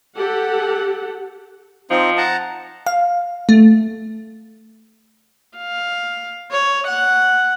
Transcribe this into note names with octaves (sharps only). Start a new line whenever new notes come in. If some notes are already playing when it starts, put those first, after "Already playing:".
G4 A4 F#5
F3 C4 D#4
F#5 A5 A#5
F5
A3
F5
C#5
F#5